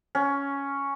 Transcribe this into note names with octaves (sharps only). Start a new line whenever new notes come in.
C#4